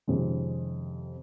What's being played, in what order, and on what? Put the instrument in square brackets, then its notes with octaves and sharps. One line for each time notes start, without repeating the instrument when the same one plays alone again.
[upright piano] F2 C3 D#3 G#3 C#4